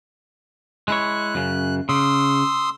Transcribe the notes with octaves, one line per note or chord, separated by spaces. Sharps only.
G#3 E4 C#5 F#6
F#2 C#3
C#3 C6 D#6 E6